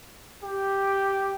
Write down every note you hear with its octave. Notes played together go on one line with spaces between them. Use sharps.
G4